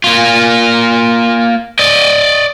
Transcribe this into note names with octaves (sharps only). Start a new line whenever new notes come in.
A#3 F4
D5 D#5